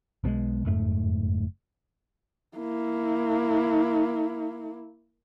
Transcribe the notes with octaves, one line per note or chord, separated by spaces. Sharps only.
B1 B2 F3 G#3
F#1 F2 G#2 A3
A#3 E4